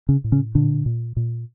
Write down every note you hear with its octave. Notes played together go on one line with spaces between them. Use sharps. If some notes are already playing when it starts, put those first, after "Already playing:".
C#3 C#4
A2
C#3 C#4
A#2 D3 D4
A#2
A#2